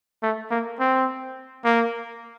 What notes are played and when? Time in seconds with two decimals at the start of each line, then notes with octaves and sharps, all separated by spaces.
0.23 A3
0.51 A#3
0.80 C4
1.64 A#3